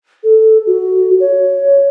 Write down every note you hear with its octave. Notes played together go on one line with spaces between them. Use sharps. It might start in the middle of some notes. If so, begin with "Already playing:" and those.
A4
F#4
C#5